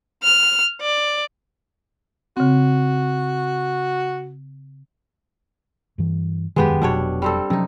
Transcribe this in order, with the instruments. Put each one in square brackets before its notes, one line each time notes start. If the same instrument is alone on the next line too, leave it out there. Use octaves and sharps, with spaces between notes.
[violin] F6
D5
[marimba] C#3 C4 [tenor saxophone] F#4
[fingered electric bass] G2 E3
[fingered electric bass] E1 F#2 D#3 [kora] G#3 B3 G4
[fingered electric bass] F1 F#3 [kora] B2 D4 C#5
[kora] G3 C4 A4
[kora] C3 D#4 [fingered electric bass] F3 F#3 C#4